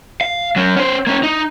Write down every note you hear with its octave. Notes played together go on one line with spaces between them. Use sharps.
F5
F#3 C#4
C#4 C5
A#3 C#4
D#4